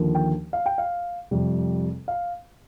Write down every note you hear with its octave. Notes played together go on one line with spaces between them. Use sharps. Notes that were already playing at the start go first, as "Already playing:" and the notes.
Already playing: D#2 D3 F3 A#3
G5
F5
G5
F5
F2 C3 G3
F5